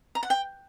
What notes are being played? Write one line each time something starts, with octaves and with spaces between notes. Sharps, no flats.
A#5
F#5
G5